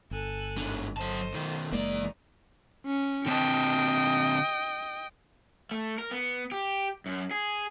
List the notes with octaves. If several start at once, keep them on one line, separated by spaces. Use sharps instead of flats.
G1 A4 G#5 F#6
G#2 D3
F#3 A4 C5 D#5 A5
B1 D#3
F#1 E2 F#3 G#3 A#3 D#4 D5
C#4
D3 C4 D#5 G5 A5
A3
A#4
B3
G4
F#2
G#4